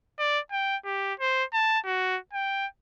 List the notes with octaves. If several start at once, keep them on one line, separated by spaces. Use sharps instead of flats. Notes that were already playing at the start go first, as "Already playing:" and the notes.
D5
G5
G4
C5
A5
F#4
G5